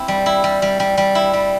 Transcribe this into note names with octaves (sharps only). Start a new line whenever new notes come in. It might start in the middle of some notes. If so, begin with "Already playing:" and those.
Already playing: C4 E4
G3
E4
G3
G3
G3
G3
E4
G3